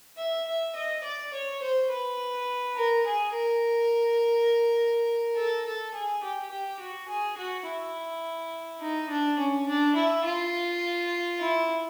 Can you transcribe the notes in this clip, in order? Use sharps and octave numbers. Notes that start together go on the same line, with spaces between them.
E5
E5
D#5
D5
C#5
C5
B4
A#4
G#4
A#4
A4
A4
G#4
G4
G4
F#4
G#4
F#4
E4
D#4
D4
C#4
D4
E4
F4
E4